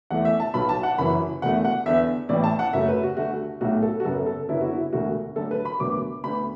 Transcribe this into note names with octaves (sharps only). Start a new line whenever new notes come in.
E2 E3 A3 F#5
E5
A5
B1 B2 F#3 B3 B5
A5
F#5
F#1 F#2 E3 B5
E1 E2 B2 A3 F#5
F#5
E2 D3 B3 E5
A1 A2 E3 D5
A5
F#5
F#1 F#2 F#3 A3 E5
B4
F#4
D2 D3 A3 F#4
B1 A2 F#3 A3 F#4
A4
F#4
F#1 F#2 F#3 B3 A4
A4
F#1 F#2 D3 B3 E4
F#4
E4
E1 D2 D3 A3 F#4
D2 D3 F#3 A4
B4
B5
E1 D2 D3 F#3 B3 D6
D2 D3 B3 B5